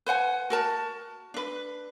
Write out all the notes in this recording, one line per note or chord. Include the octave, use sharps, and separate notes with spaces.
B4 C5 F#5 G#5
F#4 A#4 A5
D4 B4